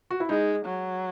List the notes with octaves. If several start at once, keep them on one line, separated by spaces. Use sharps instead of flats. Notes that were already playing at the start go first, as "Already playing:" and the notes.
F#4
E4
G#3 D#4
F#3